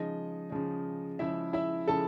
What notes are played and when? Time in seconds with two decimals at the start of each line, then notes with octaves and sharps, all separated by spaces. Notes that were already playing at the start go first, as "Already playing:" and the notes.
Already playing: C#3 F3 G#3 D#4 D#5
0.50 C#3 F3 G#3
1.19 C#3 F3 G#3 E4 E5
1.53 E4 E5
1.88 C#3 F3 G#3 A4 A5